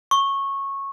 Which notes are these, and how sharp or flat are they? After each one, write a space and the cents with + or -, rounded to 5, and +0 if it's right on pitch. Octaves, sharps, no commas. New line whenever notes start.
C#6 -15